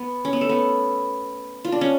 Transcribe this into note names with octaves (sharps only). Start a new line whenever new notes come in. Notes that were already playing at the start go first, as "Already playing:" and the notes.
Already playing: B3
C#4
B3
A3
B3
F4
D4
C#4